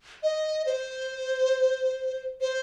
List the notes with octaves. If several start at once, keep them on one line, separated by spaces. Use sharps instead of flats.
D#5
C5
C5